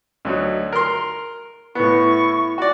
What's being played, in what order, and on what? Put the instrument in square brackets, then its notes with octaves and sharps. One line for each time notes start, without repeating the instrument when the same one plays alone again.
[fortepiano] D2 F#3 D#4
A#4 C6
[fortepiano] A2 B3 [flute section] E4 C#6
[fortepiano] F#4 D5